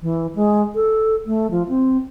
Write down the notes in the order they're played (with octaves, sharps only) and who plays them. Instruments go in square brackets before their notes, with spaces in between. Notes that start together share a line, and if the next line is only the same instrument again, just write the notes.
[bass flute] E3
G#3
A4
A3
F3
C4